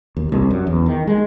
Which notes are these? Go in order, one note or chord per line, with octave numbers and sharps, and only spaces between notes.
D#2
C2
F#2
E2
D#3
G#3